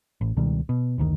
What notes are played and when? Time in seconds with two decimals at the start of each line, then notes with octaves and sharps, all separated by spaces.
0.21 A1
0.37 C#2 B2 D#3 G3
0.69 B2
0.98 F#1 D2 C3 D#3